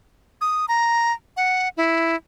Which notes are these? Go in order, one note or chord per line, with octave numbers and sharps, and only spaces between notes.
D#6
A#5
F#5
E4